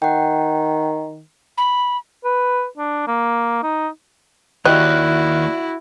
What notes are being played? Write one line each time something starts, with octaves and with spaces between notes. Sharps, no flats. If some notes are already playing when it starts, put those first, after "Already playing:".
D#3 F#5 G5
B5
B4
D4
A#3
D#4
D#2 E4 F#4 G4 D5 D#5 F#6